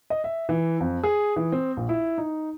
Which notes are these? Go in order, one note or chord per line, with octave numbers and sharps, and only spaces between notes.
D#5
E5
E3
F2
G#4
E3
C4
A#1
E4
D#4